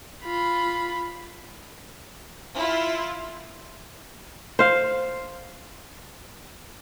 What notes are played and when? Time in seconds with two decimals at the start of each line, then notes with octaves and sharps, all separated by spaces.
0.24 F4 B5
2.56 E4 F4
4.59 C5 F5